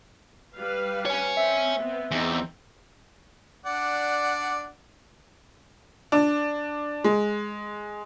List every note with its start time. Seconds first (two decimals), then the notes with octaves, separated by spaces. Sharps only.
0.55 G3 B4 F5
1.06 C#5 G#5
1.37 C4 E5
1.78 B3 C4
2.11 E2 C4 D#4 G#4
3.66 D4 D5 F#5
6.12 D4
7.04 G#3